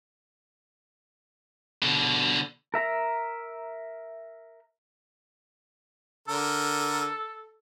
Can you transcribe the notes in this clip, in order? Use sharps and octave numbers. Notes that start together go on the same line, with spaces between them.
B2 D3
A#4 E5 A#5
D3 A4 A#4